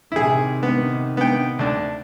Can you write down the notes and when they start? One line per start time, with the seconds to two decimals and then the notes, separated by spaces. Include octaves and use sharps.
0.12 C3 D#3 E4 G#4
0.63 B3
1.17 B3 G5
1.59 D2 D4